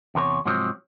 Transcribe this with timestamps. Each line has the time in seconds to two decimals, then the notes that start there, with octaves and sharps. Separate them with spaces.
0.15 E2 C3 A#4 C#5
0.46 G#2 C3 F3 F#3 C4